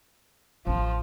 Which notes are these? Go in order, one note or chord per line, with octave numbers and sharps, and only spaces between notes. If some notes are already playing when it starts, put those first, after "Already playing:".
A1 F3 D4